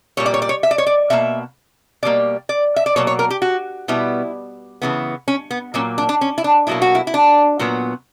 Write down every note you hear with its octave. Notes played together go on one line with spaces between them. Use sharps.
A#2 G3 A#3 C#5
D5
C#5
D5
C#5
E5
D5
C#5
D5
B2 A#3 E5
B2 G3 A#3 D5
D5
E5
D5
B2 F#3 A#3 C#5
C#5
A#4
G4
F#4
B2 G3 B3 E4
C#3 E3 B3
C#4
B3
A#2 F#3 A#3 C#4
D4
D4
C#4
E4
D4
B2 F#3 A#3 E4
F#4
E4
E4
D4
A#2 F#3 B3